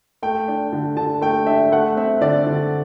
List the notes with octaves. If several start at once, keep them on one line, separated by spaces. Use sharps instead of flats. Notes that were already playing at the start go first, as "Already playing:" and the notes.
A3 G5
D4
D3
D3 A5
A3 G5
D4 E5
A3 F#5
C4 E5
D3 D5
D3